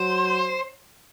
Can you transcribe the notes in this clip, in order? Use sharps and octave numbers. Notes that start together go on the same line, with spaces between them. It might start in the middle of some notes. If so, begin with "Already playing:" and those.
Already playing: F#3 C5